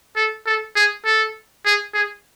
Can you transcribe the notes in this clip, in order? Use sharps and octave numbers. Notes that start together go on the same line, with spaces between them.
A4
A4
G#4
A4
G#4
G#4